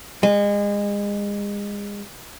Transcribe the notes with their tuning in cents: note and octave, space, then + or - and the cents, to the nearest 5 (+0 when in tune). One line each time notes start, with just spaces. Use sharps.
G#3 -30